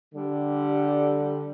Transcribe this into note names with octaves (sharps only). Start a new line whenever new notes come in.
D3 G3